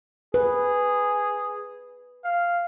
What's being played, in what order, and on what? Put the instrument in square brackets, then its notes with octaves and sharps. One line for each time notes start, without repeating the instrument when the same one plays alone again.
[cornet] G#4 [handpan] B4
[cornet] F5